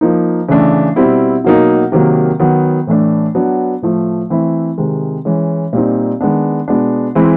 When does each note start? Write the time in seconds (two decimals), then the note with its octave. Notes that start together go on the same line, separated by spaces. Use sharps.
0.01 F3 A#3 D#4
0.49 C#3 E3 A3 D4
0.96 B2 G3 C4 E4
1.44 B2 F#3 A#3 D#4
1.92 C3 D#3 F#3 A#3
2.40 D#3 F#3 B3
2.87 A2 E3 A3 D4
3.35 F#3 B3 D4
3.82 A2 F3 A3
4.30 E3 A3 C4 E4
4.78 C3 D#3 G#3
5.25 E3 G#3 C#4
5.73 A#2 G3 C4 D#4
6.21 D#3 G#3 B3 D4
6.68 B2 G#3 B3 D4
7.15 E3 G#3 C4 E4